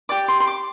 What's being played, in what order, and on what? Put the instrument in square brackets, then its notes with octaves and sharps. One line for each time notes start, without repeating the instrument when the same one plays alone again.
[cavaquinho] G4 D5 D6
C6
C6
D6